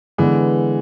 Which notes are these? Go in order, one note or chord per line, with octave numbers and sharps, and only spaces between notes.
D3 E3 G#3 B3